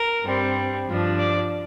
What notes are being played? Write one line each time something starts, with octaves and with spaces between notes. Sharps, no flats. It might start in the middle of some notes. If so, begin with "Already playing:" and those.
Already playing: A#4
G2 G3 C4
G2 F3 D4
D5